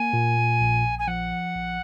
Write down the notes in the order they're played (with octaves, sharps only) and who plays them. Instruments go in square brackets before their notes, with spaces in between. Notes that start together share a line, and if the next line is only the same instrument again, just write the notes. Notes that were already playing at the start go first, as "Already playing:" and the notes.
Already playing: [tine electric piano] A#3 [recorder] G#5
[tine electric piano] A#2
A#1
[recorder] G#5
[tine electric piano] F3 [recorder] F#5
[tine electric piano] A#1